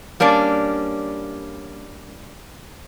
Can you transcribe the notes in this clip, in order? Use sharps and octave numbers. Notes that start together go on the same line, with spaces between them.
G3 A#3 C#4 D4 D5